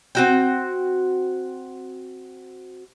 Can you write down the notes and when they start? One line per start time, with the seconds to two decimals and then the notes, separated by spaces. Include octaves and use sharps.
0.15 C4 F#4 G5